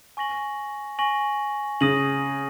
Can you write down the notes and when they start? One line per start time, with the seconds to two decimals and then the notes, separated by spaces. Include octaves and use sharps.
0.17 G#5 C#6 A#6 F#7
0.99 G#5 C#6 A#6 F#7
1.81 C#3 D#6 A#6 D#7 F#7